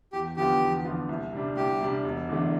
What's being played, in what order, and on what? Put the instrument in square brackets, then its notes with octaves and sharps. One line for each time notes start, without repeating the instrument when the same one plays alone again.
[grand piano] E2 [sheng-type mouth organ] G4
[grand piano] D3 F3 B3 F4 [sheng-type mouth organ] G4
[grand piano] E2
D3 F3 B3 F4
C2
C3 G3 D4
[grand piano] C2 [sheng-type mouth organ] G4
[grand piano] C3 G3 D4
E1
E2 D3 A3 D4